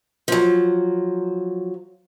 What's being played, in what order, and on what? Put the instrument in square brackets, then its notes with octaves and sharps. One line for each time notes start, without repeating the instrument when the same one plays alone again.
[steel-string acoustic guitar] F3 F#3